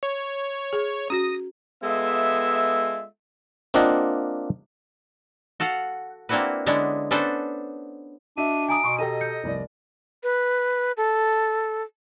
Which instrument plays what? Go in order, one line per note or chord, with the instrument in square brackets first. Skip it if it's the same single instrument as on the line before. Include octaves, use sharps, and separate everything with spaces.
[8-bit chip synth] C#5
[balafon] G#4
[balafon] C#4 F#4 [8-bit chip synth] D#6 A#6
[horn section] G#3 B3 F4 A4 E5
[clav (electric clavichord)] A#3 C4 D4 F4 D#5 F#5
[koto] F#4 A4 F5 F#5
A#3 C4 D4 E4 F#4 B4
D3 G#3 B3 C#4 D4 E4
B3 C#4 D4 A4 B4 C5
[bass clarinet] D4 [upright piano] F#4 D#5 E5 [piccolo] D#7
[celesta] G#5 A#5 D#6 [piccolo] D7
[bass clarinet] B2 [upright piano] C6 C#6
[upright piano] G4 A4 A#5 [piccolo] D#5 [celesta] G5 D#7
[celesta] G6 C#7
[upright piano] F1 C2 D5
[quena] B4
A4